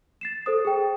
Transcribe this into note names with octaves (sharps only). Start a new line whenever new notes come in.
A6 C7 E7
A4 C5 D#6
G#4 G5